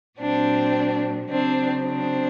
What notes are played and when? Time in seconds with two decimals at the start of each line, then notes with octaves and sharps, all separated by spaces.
0.19 A#2 F#3 C4 D4
1.29 C#3 F#3 C4 D4
1.85 C4 D4